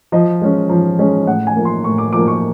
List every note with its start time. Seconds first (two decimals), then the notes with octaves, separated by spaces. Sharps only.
0.12 F3 D#5
0.41 G#3 C#4
0.69 F3
0.99 G#3 C#4
1.27 A2 F#5
1.47 G#5
1.56 F3 A#3
1.65 C6
1.84 A2 C#6
1.98 D6
2.13 F3 A#3 D6
2.28 C#6